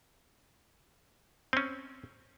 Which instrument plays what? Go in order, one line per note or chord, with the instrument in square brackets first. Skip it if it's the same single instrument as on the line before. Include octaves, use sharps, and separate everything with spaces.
[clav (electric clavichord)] C4 C#4